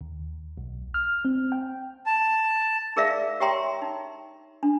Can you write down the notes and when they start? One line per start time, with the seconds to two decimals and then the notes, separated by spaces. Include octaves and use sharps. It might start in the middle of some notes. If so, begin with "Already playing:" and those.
0.01 D#2
0.57 B1
0.94 F6
1.25 C4
1.52 G5
2.06 A5
2.96 D#4 G#4 A#4 D5 E5 F5
3.40 G4 C#5 E5 G5 A#5 C6
3.82 D#4
4.63 D4